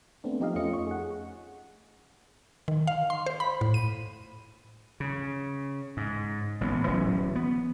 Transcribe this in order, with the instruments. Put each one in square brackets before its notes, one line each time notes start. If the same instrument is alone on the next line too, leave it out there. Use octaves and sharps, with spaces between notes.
[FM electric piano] A3 B3 C4 D4
F3 D#4 G4 D#5 F5
F2 A3 C#4 F4 D#5 C#7
C#6
G#4 F#5
[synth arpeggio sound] D#3
F5
C6
C5
B5
A2
D#7
[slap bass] C#3
G#2
A1 E3 A3 B3
D1 E3 F#3 C#4
B3